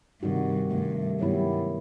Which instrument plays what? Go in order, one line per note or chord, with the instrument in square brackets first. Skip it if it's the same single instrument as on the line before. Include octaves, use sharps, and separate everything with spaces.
[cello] G2 [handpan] C3 D#3 G3 D#4 F#4
[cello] G2 [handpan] C3 D#3 A3
[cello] G2 [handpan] D#3 F#3 B3 E4 G4